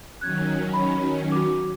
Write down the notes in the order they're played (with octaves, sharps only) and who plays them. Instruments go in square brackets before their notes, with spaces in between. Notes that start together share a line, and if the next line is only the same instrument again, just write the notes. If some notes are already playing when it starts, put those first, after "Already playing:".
[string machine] D#3 F#3 C#4 [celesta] F#6 G#6
[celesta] B5
F#4 D6